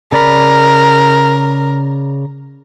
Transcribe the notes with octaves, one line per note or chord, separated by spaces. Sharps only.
C#3 A#4 D5 B5